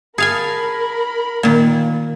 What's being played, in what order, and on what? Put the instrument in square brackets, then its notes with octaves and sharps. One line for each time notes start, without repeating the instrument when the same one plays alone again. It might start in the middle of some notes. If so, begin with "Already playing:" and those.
[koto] G#4 F5 G#5 [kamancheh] A#4 B5 [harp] A5
[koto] A#2 D#3 [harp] A#3